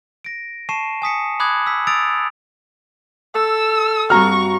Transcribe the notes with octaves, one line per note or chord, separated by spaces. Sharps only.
A#6 D7
A5 C#6 C7 D#7 E7
G#5 D#6 B6 C#7
B5 D6 D#6 F#6 G#6 F#7
E6 B6
D#6 E6 A6 D7 F7
A4 E6
G2 C4 F#4 A#5 C#6 F6